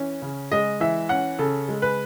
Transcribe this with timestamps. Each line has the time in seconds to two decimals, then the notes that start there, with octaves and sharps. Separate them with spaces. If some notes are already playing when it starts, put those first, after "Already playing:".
Already playing: E3 C#4
0.22 C#3
0.52 G#3 D#5
0.80 E3 E5
1.09 C#4 F#5
1.38 C#3 A4
1.69 G#3
1.82 B4